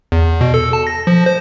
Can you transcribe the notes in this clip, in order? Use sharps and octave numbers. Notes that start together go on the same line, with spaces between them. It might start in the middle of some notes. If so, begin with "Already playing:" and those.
E2
B2
A4
A5
A#6
F3
C5